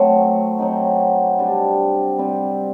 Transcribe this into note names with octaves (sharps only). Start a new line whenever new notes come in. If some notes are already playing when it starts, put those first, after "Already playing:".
Already playing: F#3 A3 C4
F#3 C4 D#4
C3 G3 D4
C3 G3 C4